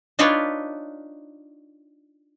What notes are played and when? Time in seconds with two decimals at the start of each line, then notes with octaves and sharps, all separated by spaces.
0.19 D4 D#4 F4 B4 C#5 D5